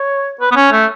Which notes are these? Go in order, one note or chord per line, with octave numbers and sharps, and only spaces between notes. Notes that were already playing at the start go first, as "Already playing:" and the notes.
Already playing: C#5
B4
B3
C#4
A3